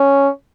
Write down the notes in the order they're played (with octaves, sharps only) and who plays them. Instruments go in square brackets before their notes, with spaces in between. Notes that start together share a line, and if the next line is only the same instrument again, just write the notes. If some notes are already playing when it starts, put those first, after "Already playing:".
Already playing: [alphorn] C#4